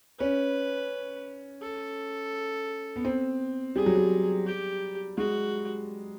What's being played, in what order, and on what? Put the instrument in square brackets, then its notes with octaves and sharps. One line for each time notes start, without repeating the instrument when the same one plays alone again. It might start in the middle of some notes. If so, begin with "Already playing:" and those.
[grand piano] C#4 [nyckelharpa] B4
[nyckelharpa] A4
[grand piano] B3
C4
[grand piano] G3 [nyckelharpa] G#4
[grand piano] F#3
G3
[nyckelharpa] G4
[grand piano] G#3 [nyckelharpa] F#4